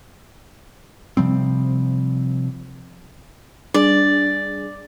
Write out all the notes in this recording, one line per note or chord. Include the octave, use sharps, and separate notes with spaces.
C3 F3 G3 C4
G3 D4 G#4 D5